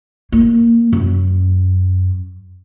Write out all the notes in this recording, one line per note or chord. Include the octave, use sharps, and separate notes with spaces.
A#3
F#2